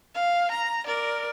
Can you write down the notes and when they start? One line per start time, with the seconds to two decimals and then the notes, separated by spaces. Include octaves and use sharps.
0.15 F5
0.51 A#5
0.87 A#4 D5